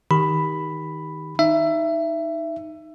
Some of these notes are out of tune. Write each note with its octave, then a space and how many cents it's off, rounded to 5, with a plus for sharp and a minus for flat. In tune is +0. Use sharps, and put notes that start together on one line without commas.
D#3 +15 G4 +0 B5 +5
D#4 +0 E5 +20